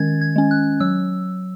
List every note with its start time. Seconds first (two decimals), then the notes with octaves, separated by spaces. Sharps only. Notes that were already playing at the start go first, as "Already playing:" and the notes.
Already playing: D#3 G#3 C#4 G#6 A6
0.21 G#6
0.36 G#3 C#4
0.51 F#6
0.80 F#3 E6